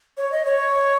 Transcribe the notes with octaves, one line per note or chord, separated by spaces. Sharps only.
C#5
D#5
C#5